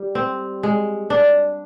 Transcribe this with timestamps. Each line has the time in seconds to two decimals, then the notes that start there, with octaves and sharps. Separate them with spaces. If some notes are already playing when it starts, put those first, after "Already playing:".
Already playing: G3
0.15 C4
0.63 G#3
1.10 D4